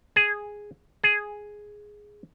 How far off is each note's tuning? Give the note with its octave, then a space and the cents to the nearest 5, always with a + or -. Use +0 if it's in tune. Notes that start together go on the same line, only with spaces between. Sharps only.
G#4 -5
G#4 +0